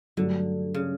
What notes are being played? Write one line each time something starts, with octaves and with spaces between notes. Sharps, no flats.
G2 D3 F#3 A3
C#3